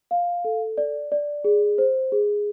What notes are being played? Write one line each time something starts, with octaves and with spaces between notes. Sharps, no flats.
F5
A4
D5
D5
G#4
C5
G#4